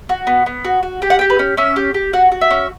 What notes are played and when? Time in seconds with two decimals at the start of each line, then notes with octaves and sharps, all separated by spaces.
0.09 F#4
0.27 B3
0.46 B3
0.65 F#4
0.83 F#4
1.02 G4 G5
1.10 F#5
1.19 G4 G5
1.30 B4
1.39 C#4
1.57 C#4 E5
1.76 G4
1.94 G4
2.13 F#4 F#5
2.32 F#4
2.41 E5
2.51 C#4